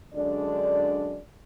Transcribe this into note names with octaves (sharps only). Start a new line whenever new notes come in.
F#2 D3 G#3 D4 D5